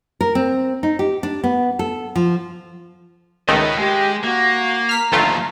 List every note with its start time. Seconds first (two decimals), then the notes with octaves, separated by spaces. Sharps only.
0.21 A#4
0.35 C4
0.83 D#4
0.99 G4
1.23 D4
1.44 B3
1.79 A4
2.16 F3
3.48 C#2 D#3 A3 B4 D#5
3.78 G#3 G4 F5
4.24 A#3 F#4
4.89 A#5 F6 B6
5.12 G1 D#2 F3 A3 F4